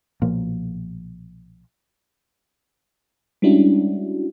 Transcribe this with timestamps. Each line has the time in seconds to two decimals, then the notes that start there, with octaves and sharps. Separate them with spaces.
0.22 B1 A#2 F3 A#3
3.42 G3 G#3 C#4 D4 E4 F#4